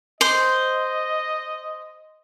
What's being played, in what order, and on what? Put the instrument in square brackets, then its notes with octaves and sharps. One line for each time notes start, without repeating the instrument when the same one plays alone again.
[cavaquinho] C5 [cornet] D#5